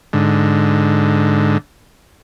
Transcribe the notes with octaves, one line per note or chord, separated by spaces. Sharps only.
G#2 D3